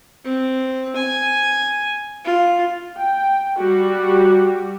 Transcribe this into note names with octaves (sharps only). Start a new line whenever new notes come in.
C4
G#5
F4
G5
G3 F#4 G4